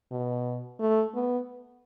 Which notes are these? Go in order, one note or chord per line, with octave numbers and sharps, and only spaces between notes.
B2
A3
B3